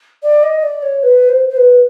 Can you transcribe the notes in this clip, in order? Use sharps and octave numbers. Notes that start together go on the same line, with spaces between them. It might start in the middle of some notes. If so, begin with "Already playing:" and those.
D5
D#5
D5
C#5
B4
C5
C5
B4